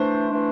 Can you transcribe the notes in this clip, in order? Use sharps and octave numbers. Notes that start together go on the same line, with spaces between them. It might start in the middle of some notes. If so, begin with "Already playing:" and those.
Already playing: E3 A3 D4 C5
E3 A3 D4